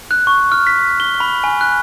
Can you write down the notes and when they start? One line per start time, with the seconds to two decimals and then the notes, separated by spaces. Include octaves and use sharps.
0.11 F#6
0.27 C#6
0.52 F6
0.67 B6
1.00 G7
1.20 B5
1.44 G#5
1.61 F#6